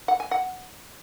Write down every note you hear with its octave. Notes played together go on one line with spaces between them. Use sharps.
F#5
G#5
F#5